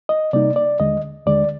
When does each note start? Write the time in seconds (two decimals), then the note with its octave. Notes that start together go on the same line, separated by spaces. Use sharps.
0.09 D#5
0.33 C3 G3 A#3 D#4 D5
0.56 D5
0.80 D#2 D3 G#3 D#5
1.27 D#2 D3 G#3 D5